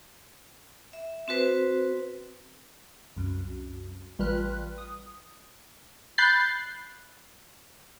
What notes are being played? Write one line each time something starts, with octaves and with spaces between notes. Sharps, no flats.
E5
C4 F#4 B4 C5
C2 F#2
A1 G3 F4 B4 F6 F#6
D#6
B5 F#6 G6 A6 C7